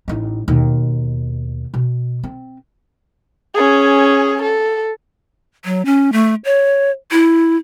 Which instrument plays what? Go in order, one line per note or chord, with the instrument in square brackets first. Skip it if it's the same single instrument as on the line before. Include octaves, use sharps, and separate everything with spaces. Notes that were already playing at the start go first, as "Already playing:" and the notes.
[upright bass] A1 D#4
D#2 B2
B2
C4
[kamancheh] C#4 G#4
A4
[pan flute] F#3
C#4
A3
C#5
E4